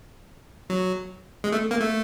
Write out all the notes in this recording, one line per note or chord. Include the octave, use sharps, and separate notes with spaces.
F#3
G#3
A3
A#3
A3